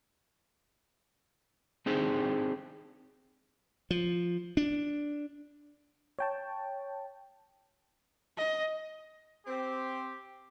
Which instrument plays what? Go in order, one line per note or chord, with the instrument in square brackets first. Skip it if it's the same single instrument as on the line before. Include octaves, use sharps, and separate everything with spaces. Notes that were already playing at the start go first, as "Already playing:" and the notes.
[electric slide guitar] C4 D4 D#4 G4 G#4 C5
[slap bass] F3
D4
[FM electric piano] C#5 G5 A5
[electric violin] D#5
[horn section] C4 [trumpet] G4